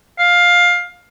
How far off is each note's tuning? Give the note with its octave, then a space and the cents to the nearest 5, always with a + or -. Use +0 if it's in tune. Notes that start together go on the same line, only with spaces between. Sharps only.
F5 +15